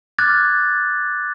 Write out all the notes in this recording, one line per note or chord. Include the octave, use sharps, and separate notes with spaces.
D6 F6 F#6 G#6 A6